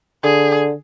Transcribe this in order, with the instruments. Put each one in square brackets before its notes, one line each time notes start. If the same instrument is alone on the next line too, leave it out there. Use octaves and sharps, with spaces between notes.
[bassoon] D3 [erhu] G#4